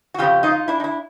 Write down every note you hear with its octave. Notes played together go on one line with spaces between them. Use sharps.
F#4
F2 C#3 F3 F4 G4
D#4 F4
D4 E4
D#4
D4 E4